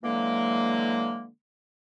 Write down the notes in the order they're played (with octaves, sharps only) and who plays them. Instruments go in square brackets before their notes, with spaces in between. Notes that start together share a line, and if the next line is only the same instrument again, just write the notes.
[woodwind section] D3 E3 F#3 G#3 A#3